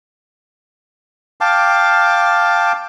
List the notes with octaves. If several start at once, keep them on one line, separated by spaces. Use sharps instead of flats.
F5 G5 A5 D6